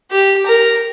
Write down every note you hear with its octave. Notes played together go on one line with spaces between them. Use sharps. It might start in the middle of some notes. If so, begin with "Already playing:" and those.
G4
A#4